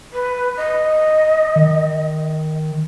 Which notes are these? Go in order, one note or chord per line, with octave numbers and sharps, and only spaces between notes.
B4
D#5
D#3